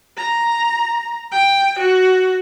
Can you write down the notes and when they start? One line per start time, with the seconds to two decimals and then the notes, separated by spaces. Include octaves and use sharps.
0.17 A#5
1.32 G5
1.79 F#4